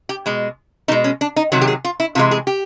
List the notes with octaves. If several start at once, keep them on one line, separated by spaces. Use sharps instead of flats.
G4
B2 G#3
B2 G#3 D#4
C#4
D4
D#4
C3 D#3 F#3 F#4
G4
G#4
F4
E4
C3 E3 G#3 F4
G#4
G4